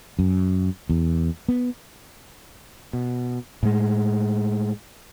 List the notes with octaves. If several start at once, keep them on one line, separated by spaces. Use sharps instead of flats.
F#2
E2
B3
B2
A2 G#3